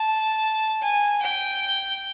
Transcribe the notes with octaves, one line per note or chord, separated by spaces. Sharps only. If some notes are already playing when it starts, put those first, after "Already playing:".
Already playing: A5
G#5
G5